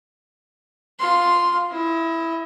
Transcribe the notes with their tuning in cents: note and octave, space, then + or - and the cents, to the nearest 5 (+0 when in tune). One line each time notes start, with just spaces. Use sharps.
F4 +5 C6 +0
E4 +5 D#5 +35